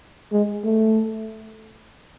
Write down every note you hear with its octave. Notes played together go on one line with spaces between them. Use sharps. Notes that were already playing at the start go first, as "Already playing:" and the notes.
G#3
A3